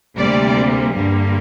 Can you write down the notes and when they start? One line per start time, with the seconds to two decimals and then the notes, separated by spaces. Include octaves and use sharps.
0.17 D2 C3 G3 A#3 D5
0.94 G2 D3 G3 A#3